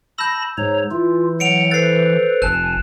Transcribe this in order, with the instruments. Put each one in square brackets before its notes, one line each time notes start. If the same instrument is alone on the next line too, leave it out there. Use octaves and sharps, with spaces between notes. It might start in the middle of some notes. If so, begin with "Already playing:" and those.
[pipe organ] A5 B5 A#6 [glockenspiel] E6 G6
[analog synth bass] G#2 [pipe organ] C#5 A#5
[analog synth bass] E3 [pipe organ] F4
[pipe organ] F#3 F#5 [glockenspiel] C#7 D7 F7
[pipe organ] A4 B4 C5 [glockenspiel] A6 C7
[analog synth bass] F1 [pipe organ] G#5 A5 [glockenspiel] F#6